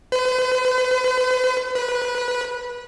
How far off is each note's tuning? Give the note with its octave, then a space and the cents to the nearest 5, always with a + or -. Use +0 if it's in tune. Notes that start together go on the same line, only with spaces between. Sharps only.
B4 +45
B4 -20